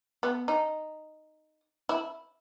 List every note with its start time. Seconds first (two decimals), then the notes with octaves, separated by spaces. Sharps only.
0.23 B3
0.48 D#4
1.89 E4